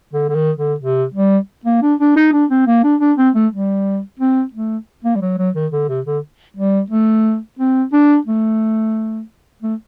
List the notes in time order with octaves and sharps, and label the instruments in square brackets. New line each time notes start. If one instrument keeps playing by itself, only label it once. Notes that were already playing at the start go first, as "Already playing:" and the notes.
[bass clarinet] D3
D3
D#3
D3
C3
G3
A#3
D4
D4
D#4
D4
C4
A#3
D4
D4
C4
A3
G3
C4
A3
A#3
G3
F#3
F#3
D#3
D3
C3
D3
G3
A3
C4
D4
A3
A3